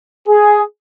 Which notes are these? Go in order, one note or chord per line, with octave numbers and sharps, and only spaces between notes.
G#4